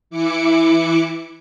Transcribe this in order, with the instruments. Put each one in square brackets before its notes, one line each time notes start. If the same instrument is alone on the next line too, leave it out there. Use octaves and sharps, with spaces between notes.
[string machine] E3 E4 D6 C#7